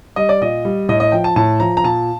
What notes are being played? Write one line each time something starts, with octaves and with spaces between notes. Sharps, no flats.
G3 D#5
D5
A#2 D#5
G3
A2 D#5
D#5
F3 G5
A5
A2 A5
F3 A#5
A#5
A#2 A5